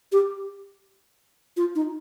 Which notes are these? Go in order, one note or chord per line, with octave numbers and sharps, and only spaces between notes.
G4
F4
D#4